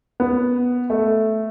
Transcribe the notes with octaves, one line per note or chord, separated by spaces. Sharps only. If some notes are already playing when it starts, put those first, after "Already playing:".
B3
A3